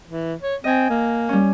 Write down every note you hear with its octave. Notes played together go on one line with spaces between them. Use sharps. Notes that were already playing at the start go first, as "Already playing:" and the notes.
E3
C#5
C4 D#5 G#5
A#3
G3 C#4